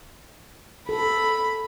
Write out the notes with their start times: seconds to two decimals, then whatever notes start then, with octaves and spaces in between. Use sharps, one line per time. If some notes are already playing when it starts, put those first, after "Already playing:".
0.89 A4 B5